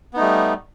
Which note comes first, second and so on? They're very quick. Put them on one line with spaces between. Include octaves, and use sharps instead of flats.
B3 D#4 A3 G3